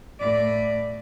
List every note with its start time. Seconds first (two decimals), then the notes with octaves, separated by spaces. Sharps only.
0.20 A2 D5